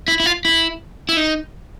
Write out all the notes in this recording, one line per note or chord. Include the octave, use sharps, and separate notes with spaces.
E4
E4
F4
E4
E4
D#4